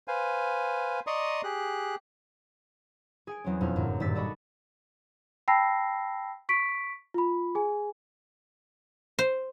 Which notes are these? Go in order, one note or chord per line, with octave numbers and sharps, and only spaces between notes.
B4 C5 F5 G#5
D5 D#5 A#5 C6 C#6 D#6
G4 G#4 F#6
G#4 G#5 D7
E2 F#3 C4 C#4
E1 F2 D4 F6
G1 F#2 A2 A#3
D#1 G2 G4 E6 A6 B6
F#4 A4 D5 D#5 B5 C#6
G5 A5 B5 E6 A#6 C7
C#6 B6 D7
F4 B5
G#4 G#5
C5